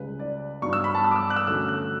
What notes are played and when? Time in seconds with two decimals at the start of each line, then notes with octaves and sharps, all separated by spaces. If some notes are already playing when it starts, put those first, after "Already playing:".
Already playing: C#2 C#3 G3 B4
0.19 D5
0.62 G2 F#3 B3 D4 C#6
0.73 E6
0.84 B5
0.94 A5
1.04 E6
1.11 D6
1.16 E6
1.30 F#6
1.36 E6
1.47 D2 D3 F#3 C#4 E6
1.68 F#6